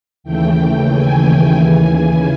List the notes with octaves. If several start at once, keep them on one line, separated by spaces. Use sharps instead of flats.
D#2 C#3 E3 A3 G5
G#5
D#2 C#3 E3 G#5